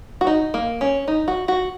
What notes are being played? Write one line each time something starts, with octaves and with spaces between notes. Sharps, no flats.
F#4
D#4
A#3
C#4
D#4
F#4
F#4